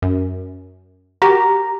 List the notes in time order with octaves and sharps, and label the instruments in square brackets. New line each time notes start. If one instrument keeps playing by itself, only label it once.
[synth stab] F#2
[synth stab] F#4 G4 A#4 [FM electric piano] A#5